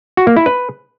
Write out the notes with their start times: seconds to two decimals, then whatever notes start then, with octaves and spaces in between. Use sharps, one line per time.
0.17 F#4
0.27 A#3
0.36 E4
0.46 B4